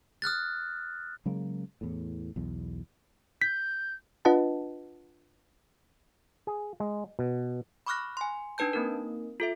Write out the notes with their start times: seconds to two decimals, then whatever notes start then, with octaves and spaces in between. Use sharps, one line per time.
0.22 D#6 F6 F#6 A6
1.26 C#3 F#3 G#3 A#3
1.81 E2 A2
2.36 B1 E2
3.42 G6 B6
4.25 D4 F4 B4 D#5 F#5 A5
6.47 G#4
6.80 G#3
7.19 B2
7.86 B5 C#6 D6 F6 F#6 A#6
8.17 G#5 C6
8.58 D4 D#4 B4 A5 G6
8.73 A#3 C4 D#4 A#4
9.40 F4 A4 E5